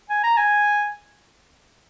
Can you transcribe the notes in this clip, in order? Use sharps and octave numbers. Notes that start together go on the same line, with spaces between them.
G#5
A#5
G#5